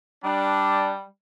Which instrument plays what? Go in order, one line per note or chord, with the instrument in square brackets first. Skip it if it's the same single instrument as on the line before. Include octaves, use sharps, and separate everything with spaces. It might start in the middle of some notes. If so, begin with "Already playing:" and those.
[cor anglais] G3 [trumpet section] D4